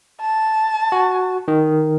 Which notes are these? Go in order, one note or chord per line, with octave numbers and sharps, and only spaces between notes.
A5
F#4
D#3